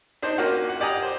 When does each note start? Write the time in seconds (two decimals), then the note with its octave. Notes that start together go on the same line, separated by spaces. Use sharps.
0.22 D4 D#4 C5
0.38 A#3 C#4 F4 F#4
0.69 F#5
0.80 G4 D5 F#5 G#5 A#5 D#6
1.02 C5